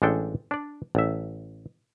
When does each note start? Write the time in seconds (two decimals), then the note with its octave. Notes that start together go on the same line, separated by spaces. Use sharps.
0.02 A1 G#3 D4 A4 G5
0.51 D4 D5
0.95 A1 E5